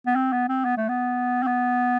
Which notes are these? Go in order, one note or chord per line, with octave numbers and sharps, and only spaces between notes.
B3
C4
B3
C4
B3
A3
B3
C4
B3